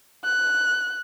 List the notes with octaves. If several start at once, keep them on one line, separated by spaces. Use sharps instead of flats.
F#6